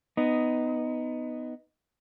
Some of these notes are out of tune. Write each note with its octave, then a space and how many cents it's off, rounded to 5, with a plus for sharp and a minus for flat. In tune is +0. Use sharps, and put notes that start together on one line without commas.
B3 +15 D#4 +0